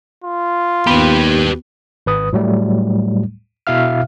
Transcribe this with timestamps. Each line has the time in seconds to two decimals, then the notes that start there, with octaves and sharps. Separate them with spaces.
0.24 F4
0.87 D#2 B3 G4 B4
2.06 G#1 B4 D#6
2.33 A2 F#3 G3 A3
3.67 B2 E4 E5 F5 F6